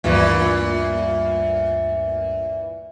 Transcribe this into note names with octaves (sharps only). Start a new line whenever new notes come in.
D2 G2 A#2 E3